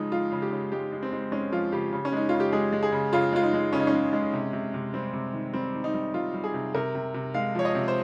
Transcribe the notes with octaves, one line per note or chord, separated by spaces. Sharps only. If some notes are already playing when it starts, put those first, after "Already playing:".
Already playing: C#3 F3 G#3 D#4
F3 F4
C#3
G4
C#3
G#3 G4
G#3
C4
G#3
G#3 C#4
F3 F4
C#3 G4
C#3
C#4
G#3 D#4
C#3 F4
G4
G#3 G#4
G#3
G#4
C#3
C#3 F4
G#3 F4
D#4
G#3
C#3 C#4
D#4
C#4
G#3
G#3
C3
C3
C3
G3 C4
C3
D#3
G3 C4
D#3
D#4
G3
G3 F4
G3
G#4
C3
C3 A#4
C3
C3
G#3 F5
F3 C#5
D#5
C3
C5